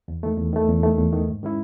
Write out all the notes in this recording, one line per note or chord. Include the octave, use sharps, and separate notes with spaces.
E2
D#3 A3
E2
D#3 A3
E2
D#3 A3
E2
D#3 A3
G#2
D#3 G#3 C#4 E4